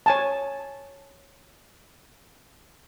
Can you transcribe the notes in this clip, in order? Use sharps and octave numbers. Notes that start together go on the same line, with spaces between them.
C#5 G#5 A5